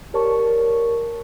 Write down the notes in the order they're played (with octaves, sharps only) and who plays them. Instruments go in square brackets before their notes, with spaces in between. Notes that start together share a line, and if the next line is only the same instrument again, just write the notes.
[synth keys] G4 A#4 C#5 D5 A5 C#6